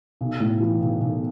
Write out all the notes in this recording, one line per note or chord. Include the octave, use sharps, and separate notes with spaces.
B1
A2
E3
B1
B1